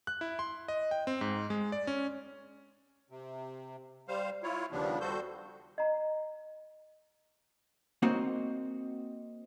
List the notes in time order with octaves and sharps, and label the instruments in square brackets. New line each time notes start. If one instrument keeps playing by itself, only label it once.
[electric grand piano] F#6
E4
C6
D#5
G5
C4
G#2
G#3
D5
C#4
[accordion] C3
G3 C5 F5
E4 F4 C#5
D#2 C#3 F3 G3 B3 D4
G3 F#4 A4 C5 G6
[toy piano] D#5 A#5
[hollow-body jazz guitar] A#3 C4 D#4 F#4 C5 C#5